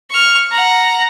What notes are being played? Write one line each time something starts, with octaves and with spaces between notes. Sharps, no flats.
C#6 F6
F#5 A#5